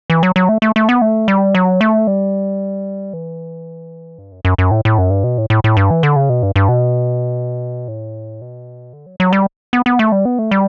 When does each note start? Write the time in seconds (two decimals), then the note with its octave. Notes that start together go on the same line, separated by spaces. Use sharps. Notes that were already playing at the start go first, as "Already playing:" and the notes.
0.10 E3
0.23 F#3
0.36 F#3
0.49 A3
0.62 A3
0.76 A3
0.89 B3
1.02 A3
1.28 G3
1.55 F#3
1.81 A3
2.07 G3
3.13 E3
4.18 G2
4.32 F#2
4.45 F#2
4.58 F#2
4.71 A2
4.85 A2
4.98 F#2
5.10 G2
5.24 B2
5.38 A2
5.50 A2
5.64 A2
5.77 G2
5.91 E3
6.03 D3
6.16 C#3
6.29 B2
6.43 G2
6.56 G2
6.69 B2
7.88 A2
8.41 B2
8.93 D3
9.06 F#3
9.20 F#3
9.33 G3
9.73 B3
9.86 B3
9.99 A3
10.12 G3
10.25 B3
10.39 A3
10.51 G3